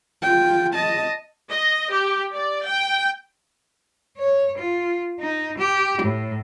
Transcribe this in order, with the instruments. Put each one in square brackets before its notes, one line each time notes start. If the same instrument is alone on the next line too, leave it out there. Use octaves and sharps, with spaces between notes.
[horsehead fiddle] F4 G5
D#5 A5
[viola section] D#5
G4
D5
G5
[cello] C#5
F4
D#4
G4
A2